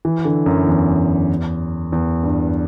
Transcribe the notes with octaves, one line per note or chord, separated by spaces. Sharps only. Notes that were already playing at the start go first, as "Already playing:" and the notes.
E3
D3
F#2
E2
E2
G2